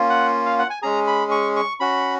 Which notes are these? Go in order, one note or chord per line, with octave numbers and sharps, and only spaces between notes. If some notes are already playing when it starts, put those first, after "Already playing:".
Already playing: A#3 C#4 F4
F#5
F5
F#5
G#5
G#3 C#4 G#4 A#5
B5
C#6
C#6
C#4 F#4 B5